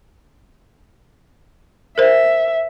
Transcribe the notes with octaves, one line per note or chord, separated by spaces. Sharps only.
A#4 C5 E5